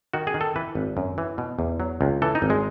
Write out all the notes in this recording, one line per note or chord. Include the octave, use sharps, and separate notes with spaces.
D#3 F#4
G#4
D#3
A4
E3 B4
G#1
F#2
E3
B2
E2
F#3
C#2
E3 A4
D#4
G#1
G#3